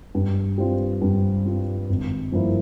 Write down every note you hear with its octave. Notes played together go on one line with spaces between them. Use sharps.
G2
G3 C4 F4
G2
G3 C4 F4
G#1
G2 F3 A#3 E4